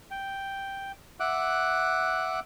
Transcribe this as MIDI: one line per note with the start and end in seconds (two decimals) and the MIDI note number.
0.11 0.92 79
1.20 2.40 76
1.20 2.40 78
1.20 2.40 86
1.20 2.40 90